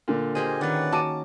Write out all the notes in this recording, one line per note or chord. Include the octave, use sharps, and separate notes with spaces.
A#2 D3
A#3 G4 G#4 C5 D#5 G#5
D#3 C#4 B4 D5 F#5
F#4 A5 D6 D#7